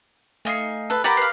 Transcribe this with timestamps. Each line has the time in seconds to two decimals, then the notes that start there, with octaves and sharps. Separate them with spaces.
0.45 A3 D#4 F5 G#5 C7
0.90 A4 B4
1.04 G4 A#4 D5 F#5 A#5 B5
1.17 B4 F5 C7